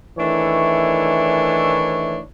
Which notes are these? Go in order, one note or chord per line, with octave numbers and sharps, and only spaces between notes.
D#3 E3 A3 D4 E4 C#5